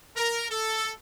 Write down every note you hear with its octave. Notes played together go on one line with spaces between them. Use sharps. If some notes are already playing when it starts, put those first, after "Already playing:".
A#4
A4